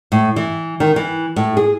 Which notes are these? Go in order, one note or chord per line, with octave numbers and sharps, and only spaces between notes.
A2
E3
D#3
E3
A2
G#4